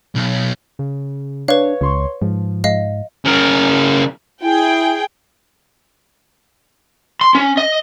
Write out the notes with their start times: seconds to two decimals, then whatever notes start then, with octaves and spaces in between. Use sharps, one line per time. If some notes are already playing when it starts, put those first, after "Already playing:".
0.16 B1
0.79 C#3
1.48 D4 B4 C#5 F5
1.81 C#2 C#5 C6 C#6
2.22 G#2 F3
2.64 G#2 D#5 F5
3.25 C#3 A#4
4.42 E4 G#4 G5
7.21 C6
7.35 C#4
7.57 D#5